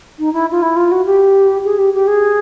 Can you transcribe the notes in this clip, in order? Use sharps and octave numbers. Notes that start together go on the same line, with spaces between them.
D#4
E4
F4
E4
F4
F#4
G4
G#4
G4
G4
G#4